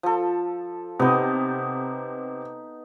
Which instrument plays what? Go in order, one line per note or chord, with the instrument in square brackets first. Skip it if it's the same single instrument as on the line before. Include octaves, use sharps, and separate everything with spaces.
[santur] F3 A4
[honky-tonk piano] C3 [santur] B3 D#4